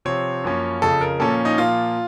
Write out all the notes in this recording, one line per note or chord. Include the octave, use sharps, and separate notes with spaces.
C3 F3 C4 C#5
F#2 F3 A#3 C#4
F2 C#3 F3 A4
A#4
A#2 F3 A#3 C#4 A4
D#4
A#2 F3 A#3 F4